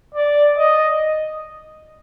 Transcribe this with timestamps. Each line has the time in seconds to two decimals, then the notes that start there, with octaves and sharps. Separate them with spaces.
0.15 D5
0.58 D#5